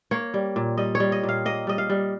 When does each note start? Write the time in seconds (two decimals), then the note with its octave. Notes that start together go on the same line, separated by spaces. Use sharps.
0.11 A#3 C#5
0.34 G3
0.56 A#2
0.77 G3 D#5
0.95 C#5
1.00 G3
1.12 D#5
1.23 A#2
1.29 F5
1.45 A#3 D#5
1.67 G3 D#5
1.78 F5
1.89 G3